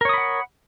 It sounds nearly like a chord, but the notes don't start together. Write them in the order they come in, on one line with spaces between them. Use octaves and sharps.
A#4 C#5 D#6 B5 F#5